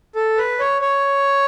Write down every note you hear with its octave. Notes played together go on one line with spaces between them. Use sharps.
A4
B4
C#5
C#5